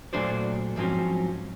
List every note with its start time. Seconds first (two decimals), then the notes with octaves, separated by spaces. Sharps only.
0.13 A#2 F#3 A3 D4 C5 D5
0.76 G#2 F3 F#3 C4 C#4